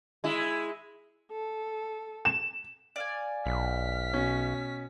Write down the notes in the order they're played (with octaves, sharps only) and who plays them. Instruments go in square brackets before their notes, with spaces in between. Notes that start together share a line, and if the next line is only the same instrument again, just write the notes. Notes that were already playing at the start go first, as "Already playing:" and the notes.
[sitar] G#3 E4
[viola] A4
[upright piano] E7
[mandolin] D5 F5 G#5
[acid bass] B1 [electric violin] F6 B6
[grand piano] B2 C#4